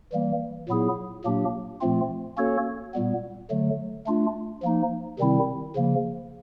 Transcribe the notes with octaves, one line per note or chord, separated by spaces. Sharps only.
E3 G3 A#3
A#2 F#3 B3 E4 G#4
A#2 F#3 A#3 D4 G4
A#2 F3 A3 C4 F4
A#3 C#4 F#4 A4 C#5
A#2 G3 B3
D3 F#3 A3
A3 D4 F4
F3 A#3 D#4
C3 D#3 G3 C4 E4
C#3 F3 A#3